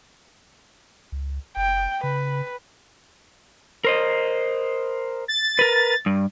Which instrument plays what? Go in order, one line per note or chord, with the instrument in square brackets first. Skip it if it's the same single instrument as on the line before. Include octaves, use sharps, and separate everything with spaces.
[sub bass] C#2
[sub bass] F#1 [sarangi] G5
[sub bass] C#3 [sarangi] B4
[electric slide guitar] A#4 C5 D#5
[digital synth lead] A6
[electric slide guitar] A#4 B4
G2